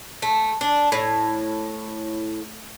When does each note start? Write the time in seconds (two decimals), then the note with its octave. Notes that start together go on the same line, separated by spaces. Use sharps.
0.22 A3
0.61 D4
0.92 A2